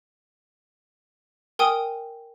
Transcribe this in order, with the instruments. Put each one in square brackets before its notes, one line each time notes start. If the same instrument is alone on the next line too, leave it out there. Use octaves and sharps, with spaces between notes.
[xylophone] A#4 G5 G#5 D#6